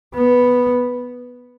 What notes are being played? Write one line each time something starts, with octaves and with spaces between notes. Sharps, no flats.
B3